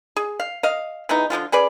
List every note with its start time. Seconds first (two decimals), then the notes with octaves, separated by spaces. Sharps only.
0.16 G#4
0.40 F5
0.63 D#5 F5
1.09 E3 G#3 B3 D#4
1.30 D3 F3 G#3 F4
1.52 C#4 G#4 B4 D5